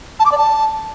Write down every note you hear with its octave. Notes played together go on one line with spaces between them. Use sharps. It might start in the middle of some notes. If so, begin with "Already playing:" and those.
A5
D6
D5
A5